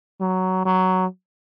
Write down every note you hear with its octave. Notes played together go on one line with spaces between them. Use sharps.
F#3
F#3